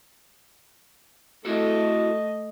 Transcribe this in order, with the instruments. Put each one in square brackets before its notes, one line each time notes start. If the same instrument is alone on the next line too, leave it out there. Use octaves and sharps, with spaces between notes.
[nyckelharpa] A3 D#5 [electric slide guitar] E4 F#4 A4